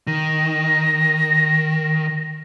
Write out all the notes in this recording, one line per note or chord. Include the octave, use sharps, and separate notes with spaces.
D#3 A#6